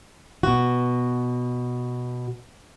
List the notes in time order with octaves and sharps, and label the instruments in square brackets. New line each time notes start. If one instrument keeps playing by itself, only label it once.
[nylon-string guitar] B2 F#4